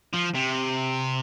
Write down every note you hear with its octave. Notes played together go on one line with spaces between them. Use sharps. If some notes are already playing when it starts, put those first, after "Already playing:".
F3
C3